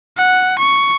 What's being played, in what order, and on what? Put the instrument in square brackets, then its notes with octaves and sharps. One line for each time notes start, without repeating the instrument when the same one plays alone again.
[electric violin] F#5
C#6